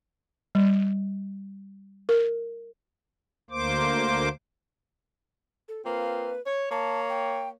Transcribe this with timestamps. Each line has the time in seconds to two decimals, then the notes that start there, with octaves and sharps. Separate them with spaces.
0.55 G3
2.09 A#4
3.50 D2 A#3 C5 D6
5.68 A4
5.86 A#3 C4 F4 B4
6.47 C#5
6.71 A#3 C#5 A5
7.09 G5